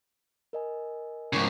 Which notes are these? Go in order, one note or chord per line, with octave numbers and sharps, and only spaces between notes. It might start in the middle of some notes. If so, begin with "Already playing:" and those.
A#4 D#5 G#5
G#2 C#3 E4 A#4 D6